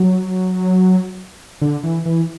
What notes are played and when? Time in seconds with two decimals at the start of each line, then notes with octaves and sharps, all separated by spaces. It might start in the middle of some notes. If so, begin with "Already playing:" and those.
Already playing: F#3
1.61 D3
1.83 E3
2.06 E3